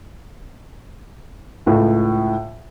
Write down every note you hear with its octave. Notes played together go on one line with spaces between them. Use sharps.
C#2 A2